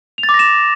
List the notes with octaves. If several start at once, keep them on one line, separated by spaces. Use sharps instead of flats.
F7
A6
D6
A#6
E7